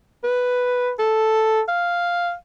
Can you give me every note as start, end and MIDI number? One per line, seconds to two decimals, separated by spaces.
0.24 0.92 71
0.99 1.62 69
1.68 2.34 77